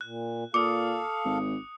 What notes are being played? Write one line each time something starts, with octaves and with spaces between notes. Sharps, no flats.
A#2 F#6
A#2 A4 F5 D6 D#6 C#7
G#1